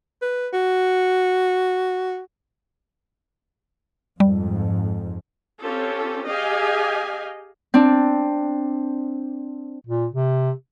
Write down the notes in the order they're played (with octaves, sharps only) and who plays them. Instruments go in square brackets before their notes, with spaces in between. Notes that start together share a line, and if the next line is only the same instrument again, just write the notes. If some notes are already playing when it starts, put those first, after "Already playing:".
[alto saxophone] B4
F#4
[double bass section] F2 G#2 [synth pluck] G3
[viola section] C4 C#4 F4 G4 A4
G4 G#4 D#5 F5 G#5
[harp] C4 D4
[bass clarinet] A#2
C3